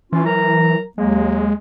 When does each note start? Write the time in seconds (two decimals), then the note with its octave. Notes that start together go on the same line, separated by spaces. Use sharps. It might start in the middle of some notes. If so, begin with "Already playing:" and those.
0.13 E3 C#4 F4
0.25 F#3 A#4 A#5
0.98 D#2 F#3 G#3 A#3